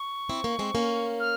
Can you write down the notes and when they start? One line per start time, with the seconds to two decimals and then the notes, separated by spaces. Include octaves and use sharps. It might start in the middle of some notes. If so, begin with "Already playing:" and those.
Already playing: C#6
0.29 C4 E4
0.44 A#3 C#4
0.59 G#3 C4
0.75 A#3 C#4
1.20 F6